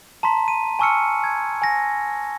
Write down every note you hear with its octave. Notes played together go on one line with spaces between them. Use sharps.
A5 A#5 C6 B6
D#7
G#5 A5 C#6 E6 F6 C#7
G#6
G#5 A#6